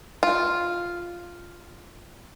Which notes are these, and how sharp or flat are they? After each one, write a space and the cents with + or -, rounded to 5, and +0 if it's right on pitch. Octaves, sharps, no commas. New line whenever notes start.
F4 +0